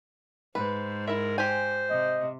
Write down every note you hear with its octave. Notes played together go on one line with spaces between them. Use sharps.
G#2 B4 C5
E4 A#4 E5
G4 C5 G#5
C3 D#5